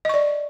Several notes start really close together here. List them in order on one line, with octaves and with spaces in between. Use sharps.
D#5 C#6 D5